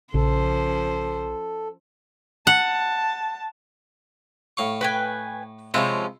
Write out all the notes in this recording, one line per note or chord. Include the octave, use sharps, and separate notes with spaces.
A#1 C#3 F3 C#4 A4 C5
F#5 A5
A2 F5 C#6
B4 G5 G#5
C3 F3 G#3 C#4 E4 F4